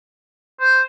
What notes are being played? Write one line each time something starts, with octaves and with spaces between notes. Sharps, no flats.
C5